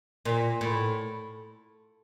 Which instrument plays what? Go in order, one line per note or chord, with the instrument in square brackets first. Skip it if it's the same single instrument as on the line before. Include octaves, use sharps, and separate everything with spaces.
[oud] A#2
A2